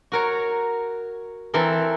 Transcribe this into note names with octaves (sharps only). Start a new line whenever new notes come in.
F#4 A#4 C#5
E3 C4 A4 A#4